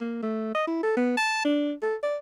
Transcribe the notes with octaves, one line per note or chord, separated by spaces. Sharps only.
A#3
A3
D#5
E4
A4
B3
A5
D4
A4
D5